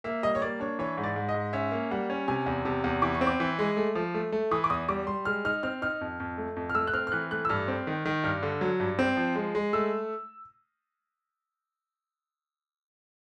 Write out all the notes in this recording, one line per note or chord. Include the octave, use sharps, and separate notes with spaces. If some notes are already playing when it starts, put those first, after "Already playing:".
A#3 E5
G3 D#5
C#5
A#3 D5
D4 C#5
E3 C#5
G#2
D5
G#2
D#5
G#2
C#4 E5
A#3
G3 F#5
C#4
C3 G#5
E2
C3 A5
E2
E3 D6
C#6
C4
D6
E3
G#3
A3
F3
A3
A3
E3 D#6
D6
E2 D#6
G3 D6
G3 C6
G#3 F6
D#4 F6
C4 F6
D#4 F6
F2
F2
A3
F2
F6
A3 E6
F#6
C4 F6
F6
E3 F#6
A3 F#6
E6
G2 F6
C4
D#3
D#3
G2 F6
D3
F#3
G2
C4
F3
G#3
G#3
A3 E6